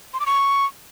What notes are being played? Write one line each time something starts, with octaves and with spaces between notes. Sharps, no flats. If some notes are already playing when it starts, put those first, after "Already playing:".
C6
D6
C#6